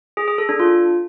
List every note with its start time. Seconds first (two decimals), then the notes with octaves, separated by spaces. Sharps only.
0.17 G#4
0.28 G#4
0.38 A4
0.49 D4
0.59 F4